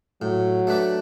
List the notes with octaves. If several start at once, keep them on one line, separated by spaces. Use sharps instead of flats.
A2 F#3
A3 D4 B4 D5